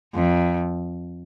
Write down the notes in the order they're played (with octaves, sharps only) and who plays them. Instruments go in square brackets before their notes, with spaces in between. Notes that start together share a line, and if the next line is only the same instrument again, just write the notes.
[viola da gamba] F2